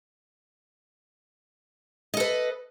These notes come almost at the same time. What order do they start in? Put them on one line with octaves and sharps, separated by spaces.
D#5 A4 B4